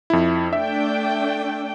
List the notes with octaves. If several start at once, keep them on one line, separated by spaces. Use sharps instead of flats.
F2 E4
A3 D4 E5 G5